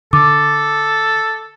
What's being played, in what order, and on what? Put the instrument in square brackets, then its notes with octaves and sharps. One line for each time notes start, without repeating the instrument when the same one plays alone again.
[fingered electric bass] D3 [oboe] A4 [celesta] D6